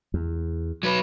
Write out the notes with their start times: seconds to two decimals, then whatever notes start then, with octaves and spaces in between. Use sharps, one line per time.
0.14 E2
0.83 F#3 B4